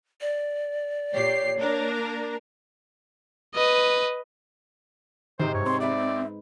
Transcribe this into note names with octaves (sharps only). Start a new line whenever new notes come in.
D5
A#2 G4 C#5 C7
A#3 D4 A#4
B4 D#5
G#2 C3 D#3 D#4 C5
G2 C#5
C4 C6
B4 D5 E5 F#5